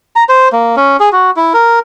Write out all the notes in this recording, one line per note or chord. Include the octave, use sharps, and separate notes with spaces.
A#5
C5
A#3
C#4
G#4
F#4
E4
A#4